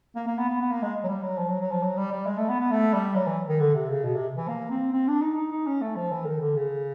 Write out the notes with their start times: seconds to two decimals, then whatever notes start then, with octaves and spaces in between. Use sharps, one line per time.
0.16 A#3
0.27 A#3
0.38 B3
0.49 B3
0.60 B3
0.71 A#3
0.82 G#3
1.04 F#3
1.08 G3
1.23 F#3
1.38 F3
1.49 F#3
1.60 F#3
1.71 F3
1.83 F#3
1.97 G3
2.12 G3
2.26 G#3
2.38 A3
2.49 B3
2.60 B3
2.71 A3
2.93 G3
3.16 F#3
3.27 E3
3.49 D#3
3.60 D3
3.75 C3
3.89 C#3
4.04 B2
4.16 C3
4.37 E3
4.48 A#3
4.71 C4
4.93 C4
5.08 D4
5.22 D#4
5.37 D#4
5.52 D#4
5.67 C#4
5.82 A3
5.96 F3
6.11 E3
6.26 D#3
6.40 D3
6.56 C#3